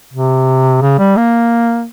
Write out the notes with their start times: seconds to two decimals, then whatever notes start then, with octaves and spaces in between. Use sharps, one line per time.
0.13 C3
0.82 C#3
0.98 G3
1.17 A#3